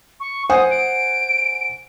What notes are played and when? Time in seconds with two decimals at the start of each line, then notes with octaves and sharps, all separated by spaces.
0.20 C#6
0.50 C5 F#5 G#5 D#6
0.71 D7